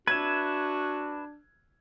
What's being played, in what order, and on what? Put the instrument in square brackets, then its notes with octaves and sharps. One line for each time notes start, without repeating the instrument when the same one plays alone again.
[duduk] D4 [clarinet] F#4 [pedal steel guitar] B4 E5 [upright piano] G#6